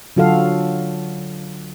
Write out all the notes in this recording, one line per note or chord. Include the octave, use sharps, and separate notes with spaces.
D3 F#3 F4 F#4 A4 F5